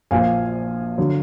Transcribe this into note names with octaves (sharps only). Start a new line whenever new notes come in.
A#1 A#2 F3 F5 G#5
D3 F#3